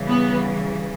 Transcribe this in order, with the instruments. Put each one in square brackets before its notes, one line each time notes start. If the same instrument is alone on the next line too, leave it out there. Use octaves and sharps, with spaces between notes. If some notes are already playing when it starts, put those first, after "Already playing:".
Already playing: [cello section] C#3 E3 G3
[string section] B3